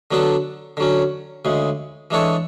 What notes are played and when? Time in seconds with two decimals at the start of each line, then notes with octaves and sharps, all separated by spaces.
0.11 D3 F#3 B3 D4 A4
0.77 D3 F#3 C#4
1.45 D2 C#3 G#3
2.11 E3 G#3 D4 A4 C#5